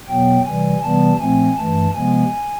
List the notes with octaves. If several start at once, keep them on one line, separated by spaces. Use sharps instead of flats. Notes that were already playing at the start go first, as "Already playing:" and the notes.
E2 B2 F#3 B3 G5
C3 E3 G3 G#5
C3 E3 G3 B3 A5
A#2 F3 A3 C4 G#5
G2 E3 A3 A5
C3 F3 G#3 B3 G#5